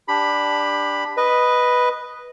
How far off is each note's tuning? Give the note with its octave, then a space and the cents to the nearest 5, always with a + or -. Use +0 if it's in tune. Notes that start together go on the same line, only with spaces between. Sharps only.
D4 +0 G4 +20 B5 +0
B4 +0 D#5 +0